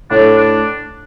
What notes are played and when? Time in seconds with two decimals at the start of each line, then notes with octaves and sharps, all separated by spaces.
0.10 A2 D4
0.38 D4